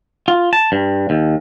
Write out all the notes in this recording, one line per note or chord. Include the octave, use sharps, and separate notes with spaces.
F4
A5
G2
D#2